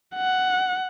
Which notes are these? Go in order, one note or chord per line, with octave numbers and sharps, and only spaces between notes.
F#5